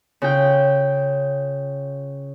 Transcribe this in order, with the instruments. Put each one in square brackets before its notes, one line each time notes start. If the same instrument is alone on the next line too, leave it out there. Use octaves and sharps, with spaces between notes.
[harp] C#3 F4 G5